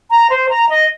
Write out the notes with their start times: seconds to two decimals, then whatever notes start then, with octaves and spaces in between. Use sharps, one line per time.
0.10 A#5
0.30 C5
0.49 A#5
0.68 D#5